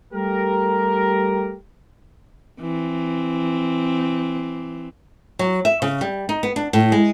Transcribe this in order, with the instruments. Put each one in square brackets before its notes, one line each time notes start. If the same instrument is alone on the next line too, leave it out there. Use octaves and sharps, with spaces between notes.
[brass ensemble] G3 A3 G4 A#4
[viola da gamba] E3 C4
[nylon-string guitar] F#3
E5
C#3
G3
D#4
B3
D4
A2
G#3